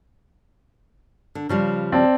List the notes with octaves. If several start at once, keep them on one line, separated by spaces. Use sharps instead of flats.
D3
C#3 F3 G3
C4 D5 A5